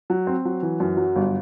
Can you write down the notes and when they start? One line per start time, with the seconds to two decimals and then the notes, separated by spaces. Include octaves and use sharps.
0.10 F#3
0.27 C4
0.45 F#3
0.63 E3
0.80 F#2
0.97 F#3
1.16 G1